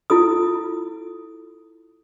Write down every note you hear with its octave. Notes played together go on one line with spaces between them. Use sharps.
E4 F4 A4 D#6